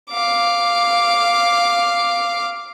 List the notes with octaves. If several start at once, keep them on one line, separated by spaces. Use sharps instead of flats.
F5 D6